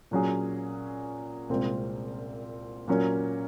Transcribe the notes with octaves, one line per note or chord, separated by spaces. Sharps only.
A#2 F#3 C#4 G#4
C2 A#2 G#3 C4 F4
A#2 F#3 A#3 C#4